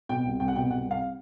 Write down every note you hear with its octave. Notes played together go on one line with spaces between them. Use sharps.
B2 G5
C2
C2 G5
F#5
B2 G5
C2 F#5
C2
F5